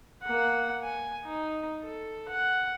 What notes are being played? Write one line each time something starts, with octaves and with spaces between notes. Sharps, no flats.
A#3 F#5
G#5
D#4
A4
F#5